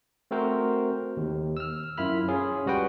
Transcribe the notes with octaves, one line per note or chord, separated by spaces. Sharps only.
A3 C4 F#4 A#4 C5
D#2
E6 F6
F#2 E4 F4 B5 F6
C#4 F4 G#4
C#2 G3 F#4 B4 G5